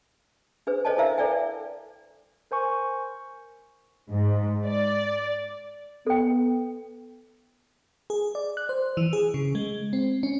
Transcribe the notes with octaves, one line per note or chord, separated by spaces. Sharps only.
D4 G#4 B4 C5
A4 C5 C#5 D#5 G#5 A5
E4 A#4 C5 E5 F5 A#5
A4 B4 D5 E5 G5 G#5
A#4 C5 G#5 C#6
G#2
D5
B3 A4 G5
G#4
D5
F#6
C5
E3
G#4
C#3
G#3
C4
C#4